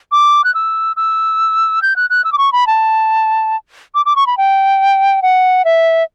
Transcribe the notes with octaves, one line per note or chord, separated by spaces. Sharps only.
D6
F#6
E6
E6
G6
F#6
F#6
E6
D6
C#6
B5
A5
D6
D6
C#6
B5
G5
F#5
E5